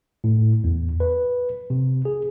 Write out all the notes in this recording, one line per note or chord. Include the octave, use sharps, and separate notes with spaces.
A2
E2
B4
C3
G#4